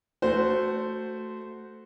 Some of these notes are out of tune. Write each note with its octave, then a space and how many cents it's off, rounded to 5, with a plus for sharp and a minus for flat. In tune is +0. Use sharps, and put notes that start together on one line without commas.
A3 +0 F#4 +0 C5 -10